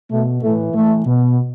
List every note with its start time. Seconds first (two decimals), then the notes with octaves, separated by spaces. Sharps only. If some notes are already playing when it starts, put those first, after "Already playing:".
0.11 B2 A3
0.42 A2 E3 A3
0.74 A2 E3 A3
1.06 B2